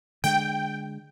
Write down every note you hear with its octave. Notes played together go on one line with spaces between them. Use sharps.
D3 G#3 G5